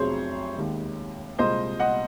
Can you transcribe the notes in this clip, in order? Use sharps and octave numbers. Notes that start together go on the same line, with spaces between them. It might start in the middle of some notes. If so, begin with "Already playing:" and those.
Already playing: F1 F2 C3 F#3 G#4 C5 C#5
D#2 D#3 G#3
C2 A#2 G#3 C5 D#5
D#5 F#5